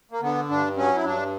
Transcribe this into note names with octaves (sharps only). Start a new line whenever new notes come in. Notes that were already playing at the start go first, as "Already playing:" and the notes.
A#3
D3 B3
G2 D4
F#3 C#4
E4
G2 D4